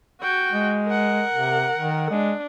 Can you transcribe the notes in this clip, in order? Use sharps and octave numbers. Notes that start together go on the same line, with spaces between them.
F#4 G5
G#3
A#4 F#5
C3
D#3
G#3 D4